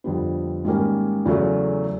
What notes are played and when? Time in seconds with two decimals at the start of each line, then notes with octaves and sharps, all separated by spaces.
0.04 F2 D3 G3 B3
0.65 G#2 D#3 G3 A#3 C#4
1.25 E2 C#3 F#3 A3